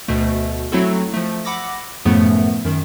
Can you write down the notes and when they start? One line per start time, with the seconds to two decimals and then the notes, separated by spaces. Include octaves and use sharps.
0.08 D2 B2 A3
0.72 F#3 A3 C4 E4 F#4 A4
1.14 F3 A3
1.45 F#5 B5 D6 E6 A#6
2.05 F#2 A2 C#3 F3 A3 B3
2.65 F#2 D#3